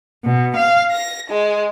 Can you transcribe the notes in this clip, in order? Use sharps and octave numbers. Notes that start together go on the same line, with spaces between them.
B2
F5
A#6
G#3